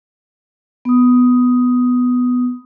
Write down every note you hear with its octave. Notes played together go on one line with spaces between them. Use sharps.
B3 D#6